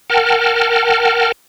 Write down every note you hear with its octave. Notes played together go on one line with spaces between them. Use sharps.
A#4 F#5 G5 A5 F6